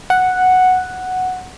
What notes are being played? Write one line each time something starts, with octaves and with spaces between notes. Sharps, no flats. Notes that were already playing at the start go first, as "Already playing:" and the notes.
F#5